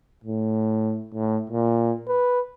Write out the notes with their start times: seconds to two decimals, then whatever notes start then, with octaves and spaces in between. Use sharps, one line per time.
0.24 A2
1.14 A2
1.50 A#2
2.08 B4